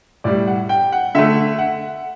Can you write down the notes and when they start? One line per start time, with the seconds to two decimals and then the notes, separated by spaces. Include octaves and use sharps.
0.24 A2 G3 D5
0.47 F#5
0.69 G5
0.92 F#5
1.15 D3 A3 E5
1.59 F#5